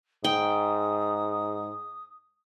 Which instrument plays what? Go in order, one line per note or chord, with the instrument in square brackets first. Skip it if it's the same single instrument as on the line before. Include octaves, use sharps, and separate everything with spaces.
[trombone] G#2 [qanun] G5 [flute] D#6